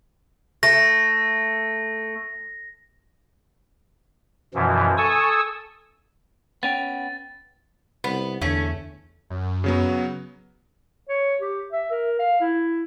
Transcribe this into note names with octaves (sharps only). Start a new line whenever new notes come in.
A3 A#6
F#2 B2 E3 F3
A4 G#5 C#6 D#6 E6
B3 C#4 G5 A6
C2 B3
E2 D3 A3 C#4
F#2
C#3 F#3 B3
C#5
G4
E5
A#4
F5
E4